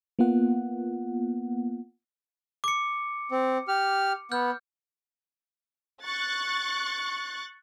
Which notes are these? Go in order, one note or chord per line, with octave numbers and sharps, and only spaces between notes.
A#3 B3 F4 F#5
D6 C#7
C4
G4 F6
B3 F6 G6
C#6 F#6 A6